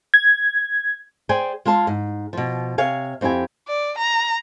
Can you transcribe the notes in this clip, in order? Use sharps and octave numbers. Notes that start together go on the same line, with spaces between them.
G#6
G#4 C5 D5 G5 G#5
G#3 F4 G#4 A5
G#2
B2 F3
C3 C#5 F5 G#5
F2 C4 E4 G4 G#5
D5
A#5